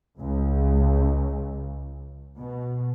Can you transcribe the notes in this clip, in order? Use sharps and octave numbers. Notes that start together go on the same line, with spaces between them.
C#2
B2